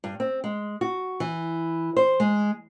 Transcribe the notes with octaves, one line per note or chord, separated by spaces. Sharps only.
G2
C4
G#3
F#4
E3
C5
G#3